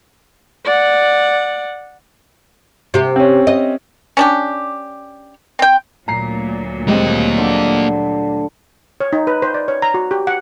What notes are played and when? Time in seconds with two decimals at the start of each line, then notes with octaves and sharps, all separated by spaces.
0.65 D5 F#5
2.94 C3 G4
3.16 C4 C#4
3.47 D#5
4.17 C#4 D4 G4
5.59 C4 G5
6.08 D2 A#2 F#3 A#5 C7
6.88 G3 G#3 A#3 C4 D#5
7.38 D3
9.00 C#5
9.13 D#4
9.27 B4
9.42 C5
9.54 D5
9.68 C#5
9.82 A#5
9.94 F#4
10.11 G4
10.27 F#5